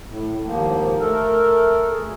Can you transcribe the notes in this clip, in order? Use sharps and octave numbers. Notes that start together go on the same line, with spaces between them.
A2
D#2 G#2 F3 A#3
A3 A4 A#4
D2 G#4